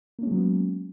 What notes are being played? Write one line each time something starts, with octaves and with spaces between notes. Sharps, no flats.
F#3 G#3 A#3 B3 C#4